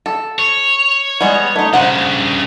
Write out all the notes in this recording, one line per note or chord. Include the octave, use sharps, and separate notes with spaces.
A4
C#5
G3 G#3 B3
A3 D#4
G2 C#3 C5 F#5